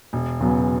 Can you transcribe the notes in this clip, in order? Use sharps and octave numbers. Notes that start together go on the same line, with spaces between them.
E1
E2 C#3 F#3 B3